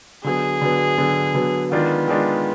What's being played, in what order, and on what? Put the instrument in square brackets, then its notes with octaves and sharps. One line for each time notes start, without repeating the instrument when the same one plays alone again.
[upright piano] D3 F#3 B3 [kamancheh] G#4
[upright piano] D3 F#3 B3
D3 F#3 B3
D3 F#3 B3
[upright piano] D#3 G#3 D4 F4 [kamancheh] B3
[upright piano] D#3 G#3 D4 F4